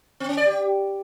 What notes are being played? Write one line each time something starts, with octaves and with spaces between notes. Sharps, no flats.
C4
C#4
D5
G4